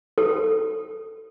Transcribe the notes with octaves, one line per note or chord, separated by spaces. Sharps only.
A4